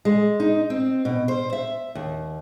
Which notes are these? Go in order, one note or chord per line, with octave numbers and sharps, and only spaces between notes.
G#3
D#4
C4
B2
C5
E5
D#2